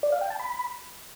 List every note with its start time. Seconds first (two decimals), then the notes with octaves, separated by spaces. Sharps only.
0.03 D5
0.12 F5
0.21 G5
0.30 A5
0.39 B5